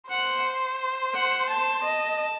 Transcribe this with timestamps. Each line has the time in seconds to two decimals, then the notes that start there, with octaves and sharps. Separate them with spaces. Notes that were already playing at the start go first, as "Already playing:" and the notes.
0.10 C5 F#5
1.14 F#5
1.49 A5
1.84 D#5